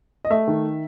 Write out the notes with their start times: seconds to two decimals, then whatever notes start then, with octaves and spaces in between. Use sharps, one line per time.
0.25 D#5
0.30 A3 E5
0.47 D#3